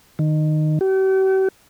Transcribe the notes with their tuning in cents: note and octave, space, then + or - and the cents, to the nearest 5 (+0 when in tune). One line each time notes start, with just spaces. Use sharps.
D#3 -15
G4 -45